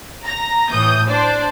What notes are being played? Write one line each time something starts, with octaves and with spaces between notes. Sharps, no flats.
A#5 A#6
A2 E3 D#6 G6
D4 C5 D5